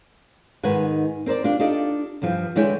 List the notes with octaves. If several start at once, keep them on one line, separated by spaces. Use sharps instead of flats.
G#2 D#3 D#4 B4 F#5 G#5
C4 A#4 C5 D5
D4 F4 G4
D4 D#4 F4 G4 A4 D#5
G2 E3 F3 G5
D3 E3 G#3 E4 C#5 G5